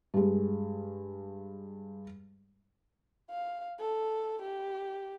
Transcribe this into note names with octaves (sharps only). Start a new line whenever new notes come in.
G2 G#3
F5
A4
G4